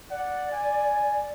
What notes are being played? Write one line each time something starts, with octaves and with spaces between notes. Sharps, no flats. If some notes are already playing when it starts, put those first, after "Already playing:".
D5 F#5
G#5